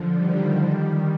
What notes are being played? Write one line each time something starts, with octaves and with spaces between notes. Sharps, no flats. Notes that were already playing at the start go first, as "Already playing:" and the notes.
Already playing: D3 F3
D#3 G3
D#3 G3